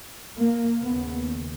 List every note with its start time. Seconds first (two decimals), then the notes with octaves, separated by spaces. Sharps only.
0.36 A#3
0.81 D#2 C#3 B3